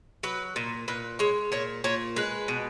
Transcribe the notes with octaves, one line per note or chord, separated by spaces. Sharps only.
F#3 B4
A#2
A#2 B4
G#3 C#5
A#2 C#5
A#2 C#5
G#3 B4
B2